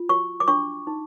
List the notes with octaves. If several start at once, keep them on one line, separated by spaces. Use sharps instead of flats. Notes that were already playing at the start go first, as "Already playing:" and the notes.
Already playing: F4
F#4 C#6
D6
D4 C#6
D#4